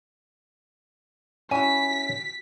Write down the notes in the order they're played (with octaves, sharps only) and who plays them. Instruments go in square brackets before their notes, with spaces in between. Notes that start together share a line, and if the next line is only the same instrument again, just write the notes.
[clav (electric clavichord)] C#4 E4 [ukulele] F#4 G#5 [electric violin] B6